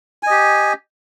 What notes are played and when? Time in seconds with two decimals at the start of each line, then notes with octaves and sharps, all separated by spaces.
0.23 G#5
0.27 D#5
0.31 G4